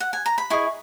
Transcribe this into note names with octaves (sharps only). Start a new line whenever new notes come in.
F#5
G#5
A#5
B5
E4 G#4 D#5 C#6